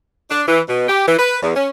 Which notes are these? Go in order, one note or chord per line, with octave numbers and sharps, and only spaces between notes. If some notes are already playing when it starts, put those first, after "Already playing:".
D4
E3
B2
G4
E3
B4
E2
C#4